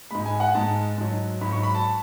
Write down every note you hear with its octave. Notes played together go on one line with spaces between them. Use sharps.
G#2 G#3 B5
G#5
F#5
G#2 G#3 A5
G#2 F#3
G#2 F#3 B5
C#6
B5
A5